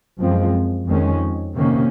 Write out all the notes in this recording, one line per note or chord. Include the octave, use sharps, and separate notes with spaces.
F#2 F3 G#3 C4
F2 D#3 G#3 C#4
C3 D#3 A#3 C#4